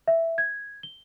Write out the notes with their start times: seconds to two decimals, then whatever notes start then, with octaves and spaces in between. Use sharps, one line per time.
0.08 E5
0.38 G#6
0.83 G7